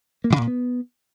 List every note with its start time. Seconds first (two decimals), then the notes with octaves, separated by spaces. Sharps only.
0.24 A#3
0.30 A2
0.36 C#3
0.42 A#2
0.47 B3